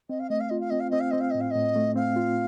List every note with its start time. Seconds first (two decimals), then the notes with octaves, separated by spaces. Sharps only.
0.09 C4 D#5
0.19 F5
0.29 A3 D#5
0.40 F5
0.49 F4 D#5
0.60 F5
0.70 C4 D#5
0.80 F5
0.90 C4 D#5
1.00 F5
1.11 C4 D#5
1.20 F5
1.30 A2 D#5
1.40 F5
1.51 A2 D#5
1.76 A3
1.96 C4 F5
2.16 F4